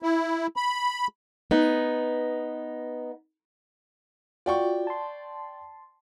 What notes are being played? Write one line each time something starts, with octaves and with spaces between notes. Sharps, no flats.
E4
B5
B3 D#4
F4 F#4 D5 G5 C#6
A5 C6